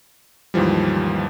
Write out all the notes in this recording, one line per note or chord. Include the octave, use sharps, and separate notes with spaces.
D#2 G#2 E3 F3 G3